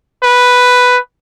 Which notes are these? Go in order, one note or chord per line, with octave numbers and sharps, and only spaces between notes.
B4